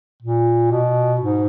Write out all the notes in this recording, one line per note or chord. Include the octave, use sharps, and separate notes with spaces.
A#2
B2
G#2